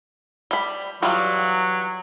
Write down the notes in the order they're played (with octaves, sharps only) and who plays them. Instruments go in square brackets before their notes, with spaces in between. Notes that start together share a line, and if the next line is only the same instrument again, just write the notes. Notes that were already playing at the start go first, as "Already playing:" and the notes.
[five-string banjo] G3 B5
[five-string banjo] E3 G3 F4 [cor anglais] F#3